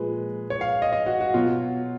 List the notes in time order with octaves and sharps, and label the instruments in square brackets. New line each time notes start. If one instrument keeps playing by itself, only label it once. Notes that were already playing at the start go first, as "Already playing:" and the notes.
Already playing: [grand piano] A#2 F3 G#3 B4
C#5
F5
D#5
D#5
F#4
F#4
B2 F#3 F4